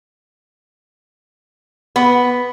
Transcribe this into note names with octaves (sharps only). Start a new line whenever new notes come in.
B3